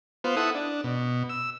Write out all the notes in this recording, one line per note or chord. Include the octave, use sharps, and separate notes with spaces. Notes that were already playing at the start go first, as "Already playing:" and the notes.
B3 F4 C5
E4 A4 F#5 D#6
D4
B2
E6